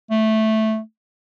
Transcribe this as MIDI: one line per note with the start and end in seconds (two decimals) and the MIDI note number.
0.11 0.80 57